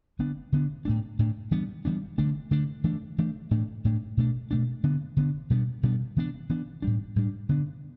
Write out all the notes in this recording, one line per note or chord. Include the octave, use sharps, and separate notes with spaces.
D3 B3 D4
D3 B3 D4
A2 A3 D4
A2 A3 D4
E3 G3 B3 D4
E3 G3 B3 D4
D3 A3 D4
D3 A3 D4
E3 A3 D4
E3 A3 D4
A2 A3 D4
A2 A3 D4
B2 A3 D4
B2 A3 D4
D3 B3 D4
D3 B3 D4
B2 G3 B3 D4
B2 G3 B3 D4
E3 B3 D4
E3 B3 D4
A2 G3 D4
A2 G3 D4
D3 B3 D4